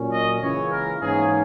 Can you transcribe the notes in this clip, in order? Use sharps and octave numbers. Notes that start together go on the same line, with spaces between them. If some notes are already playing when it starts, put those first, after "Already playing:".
Already playing: A#2 F#3 C#4
D#5
C#2 C#3 E3 A#3 C#5
A#4
G#2 E3 A#3 C#4 G#4